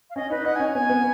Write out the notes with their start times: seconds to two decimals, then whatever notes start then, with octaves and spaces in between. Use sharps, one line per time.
0.10 F5
0.16 C#4 D#5
0.30 D#4 B4
0.45 D#4 F#5
0.56 G#5
0.60 C#4
0.74 B3 G#5
0.90 B3